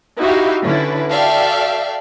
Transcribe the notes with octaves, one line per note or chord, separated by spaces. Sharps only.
D#4 E4 F#4 G4 E5 F5
D3 C#4 E4 B4
F#4 A4 D5 E5 F5 G5